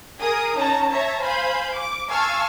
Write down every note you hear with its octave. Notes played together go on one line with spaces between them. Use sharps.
G#4 A#4 D#6
C#4 D#4 A5 A#5
C#5 E5 A5 A#5
C5 F5 G#5 B5 G6
D6
F5 G#5 A5 C#6 E6 F6